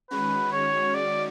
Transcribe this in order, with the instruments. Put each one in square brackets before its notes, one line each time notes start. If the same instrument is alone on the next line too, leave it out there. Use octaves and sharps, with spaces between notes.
[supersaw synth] D#3 G#3 C#4 F#4 [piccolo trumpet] B4
[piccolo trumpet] C#5
D5